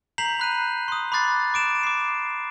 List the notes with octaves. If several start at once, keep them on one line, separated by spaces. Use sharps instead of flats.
A#5 G6 B6 C7 F7 F#7
B5 F#6 D#7
C6 D#6
B5 C6 D6 F#6 A6 C7
D6 D7 E7
D6 C7